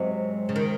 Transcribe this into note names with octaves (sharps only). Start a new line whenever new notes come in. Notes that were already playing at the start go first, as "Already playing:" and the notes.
Already playing: G#2 C3 F#3
C#3
D#3